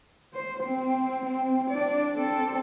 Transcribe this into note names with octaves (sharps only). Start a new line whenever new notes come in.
C5
C4
C4
D4 D5
C4 A4